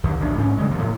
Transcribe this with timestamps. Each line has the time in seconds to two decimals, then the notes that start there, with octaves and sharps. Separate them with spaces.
0.04 D#2 D3
0.20 B1 E2 A2 D4
0.37 G#2 C#4
0.58 D3 G3 G#3
0.71 D#1 C3 F3 A#3
0.83 A2